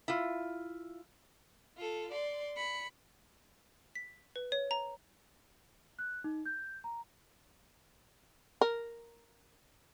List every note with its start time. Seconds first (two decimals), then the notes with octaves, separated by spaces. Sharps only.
0.08 E4 F4
1.77 F4 A4
2.11 D5 C6
2.56 B5 C#7
3.95 B6
4.36 B4
4.52 C#5
4.71 A#5
5.99 F#6
6.24 D#4
6.46 G6
6.84 A#5
8.61 A#4